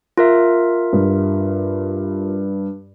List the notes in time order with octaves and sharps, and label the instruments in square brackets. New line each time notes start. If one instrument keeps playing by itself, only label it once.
[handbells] F4 A#4 E5
[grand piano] G2